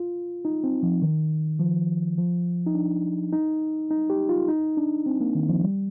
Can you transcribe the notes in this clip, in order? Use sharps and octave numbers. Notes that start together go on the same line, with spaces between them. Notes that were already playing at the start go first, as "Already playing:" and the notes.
Already playing: F4
D#4
C4
F3
D#3
F3
F3
D#4
D4
D#4
D#4
G4
F4
D#4
D4
C4
A#3
D#3
F3
G3